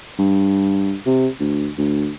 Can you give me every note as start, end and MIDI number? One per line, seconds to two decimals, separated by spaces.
0.19 0.95 43
1.06 1.27 48
1.40 1.69 38
1.78 2.11 38